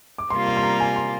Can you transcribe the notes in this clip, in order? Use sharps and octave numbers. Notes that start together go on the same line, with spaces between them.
D6
C3 G3 A#3 F4 C6
C6
C6
A#5
G#5
C6